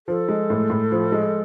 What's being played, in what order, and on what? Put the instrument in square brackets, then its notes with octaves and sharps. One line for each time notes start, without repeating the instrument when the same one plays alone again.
[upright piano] F3 [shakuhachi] A4
[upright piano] G#3
A2
A2
F3
G#3